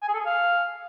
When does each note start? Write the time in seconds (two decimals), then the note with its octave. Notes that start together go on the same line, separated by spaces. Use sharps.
0.02 G#5
0.08 G#4
0.14 A4
0.20 G#4
0.25 F5